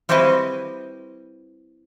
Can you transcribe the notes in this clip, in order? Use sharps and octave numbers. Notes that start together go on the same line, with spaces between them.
G3 C4 E4 F#4 B4 D#5